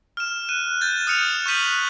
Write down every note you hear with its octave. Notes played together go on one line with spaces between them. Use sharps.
F6 E7
F#6 D#7
G6 A6
D#6 F6 C#7 F7
C#6 F#6 G6 B6 D#7 F#7